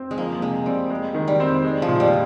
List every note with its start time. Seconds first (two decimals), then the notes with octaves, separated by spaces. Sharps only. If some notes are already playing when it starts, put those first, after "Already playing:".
Already playing: C4
0.11 G#3
0.18 F3 A#3
0.42 C3 G#3
0.66 G3 C4
0.90 G#3
1.14 D#3
1.28 G3
1.40 C4
1.64 G#3
1.82 F3
1.88 A#2
2.00 G3